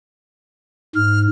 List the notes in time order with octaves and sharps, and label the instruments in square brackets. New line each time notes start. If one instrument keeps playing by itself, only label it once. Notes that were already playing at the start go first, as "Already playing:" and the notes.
[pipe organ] G#2 [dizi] F6